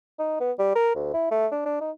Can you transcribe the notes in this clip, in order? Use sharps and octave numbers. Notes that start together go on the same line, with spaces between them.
D#4
B3
G3
A#4
D2
E4
A3
D4
D4
D#4